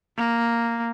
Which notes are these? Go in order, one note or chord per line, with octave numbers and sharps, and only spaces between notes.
A#3